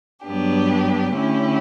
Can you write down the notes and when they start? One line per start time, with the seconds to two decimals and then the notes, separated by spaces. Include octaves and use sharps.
0.24 G2 F#3 B3 D4 G4
1.14 D3 A3 C#4 E4 G4